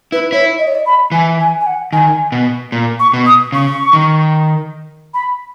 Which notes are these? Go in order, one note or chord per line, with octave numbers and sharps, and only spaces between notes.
E4 B4
E4 C#5
D#5
C#5
D#5
B5
E3 G#5
G#5
G#5
F#5
D#3 G#5
B2
A#2
C#6
B2
D#6
C#3 C#6
D#3
B5